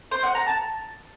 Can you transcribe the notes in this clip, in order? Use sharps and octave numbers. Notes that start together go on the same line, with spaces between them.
C5
F#5
A#5
A5